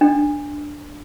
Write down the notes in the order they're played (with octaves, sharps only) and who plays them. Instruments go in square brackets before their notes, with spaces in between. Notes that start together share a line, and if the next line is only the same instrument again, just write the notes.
[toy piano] D4